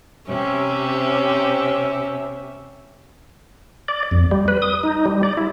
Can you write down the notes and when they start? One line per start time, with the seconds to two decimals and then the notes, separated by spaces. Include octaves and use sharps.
0.28 C3 C#4 G4 E5
3.88 D5
4.11 F2
4.31 G3
4.48 B4
4.62 D#6
4.83 D#4
5.06 G3
5.23 D5
5.37 E4